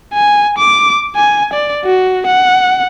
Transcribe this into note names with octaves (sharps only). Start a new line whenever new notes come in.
G#5
D6
G#5
D5
F#4
F#5